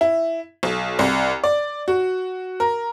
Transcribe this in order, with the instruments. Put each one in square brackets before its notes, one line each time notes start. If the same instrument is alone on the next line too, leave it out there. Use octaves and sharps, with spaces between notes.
[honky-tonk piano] E4
B1
C2
D5
F#4
A#4